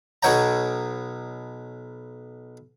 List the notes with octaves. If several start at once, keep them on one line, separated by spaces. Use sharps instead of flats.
B1 B2 B3 C#5 G5 A#5